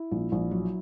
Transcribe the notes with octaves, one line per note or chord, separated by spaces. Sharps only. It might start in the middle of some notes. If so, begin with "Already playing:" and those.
Already playing: E4
A#1
A#1
F#3